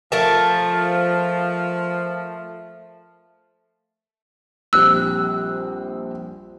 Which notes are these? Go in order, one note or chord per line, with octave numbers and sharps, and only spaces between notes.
F3 A3 A#4 A5
A#1 G3 C4 E6 F#6